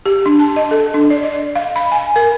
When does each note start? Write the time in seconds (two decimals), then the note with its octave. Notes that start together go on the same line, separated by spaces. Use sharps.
0.05 G4
0.26 D4
0.39 A5
0.56 D#5
0.71 A4
0.94 D4
1.10 D5
1.23 D#5
1.55 F5
1.76 B5
1.92 G#5
2.16 A#4